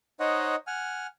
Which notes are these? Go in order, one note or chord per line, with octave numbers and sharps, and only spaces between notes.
D#4 C5 C#5 D#5 F#5
F#5 G#5 F6